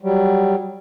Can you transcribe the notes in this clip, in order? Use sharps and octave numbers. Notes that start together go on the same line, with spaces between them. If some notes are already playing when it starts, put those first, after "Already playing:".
F#3 G3